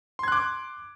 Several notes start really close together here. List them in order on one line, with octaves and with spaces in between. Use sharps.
C6 G#6 F#6 D6